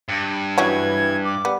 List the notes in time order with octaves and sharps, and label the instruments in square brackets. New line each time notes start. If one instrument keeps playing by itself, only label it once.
[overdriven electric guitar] G2
[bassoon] E3 [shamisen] F#3 C#4 F#4 [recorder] G#6
[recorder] D6
[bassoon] G3 [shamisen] B3